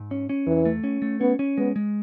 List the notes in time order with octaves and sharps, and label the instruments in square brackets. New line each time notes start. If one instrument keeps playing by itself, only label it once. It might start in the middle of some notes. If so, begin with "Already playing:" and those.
Already playing: [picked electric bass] G#2
C#4
C#4
[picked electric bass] E2 [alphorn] E3
[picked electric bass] A3
C#4
A3
[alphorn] B3 [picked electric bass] C#4
[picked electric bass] C#4
[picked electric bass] G#3 [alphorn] B3
[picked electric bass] G#3